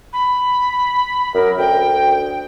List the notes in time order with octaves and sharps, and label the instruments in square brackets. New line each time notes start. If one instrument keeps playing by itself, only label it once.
[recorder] B5
[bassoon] F#2 [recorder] A#4
[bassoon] D2 [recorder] G5